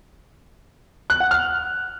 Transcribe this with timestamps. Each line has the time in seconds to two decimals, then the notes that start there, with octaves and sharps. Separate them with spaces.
1.10 F#6
1.20 F#5
1.31 F6